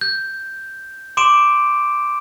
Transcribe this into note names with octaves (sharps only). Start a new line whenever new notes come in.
G6
C6 D6 D7 E7